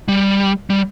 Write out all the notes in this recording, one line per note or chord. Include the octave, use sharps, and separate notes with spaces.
G3
G3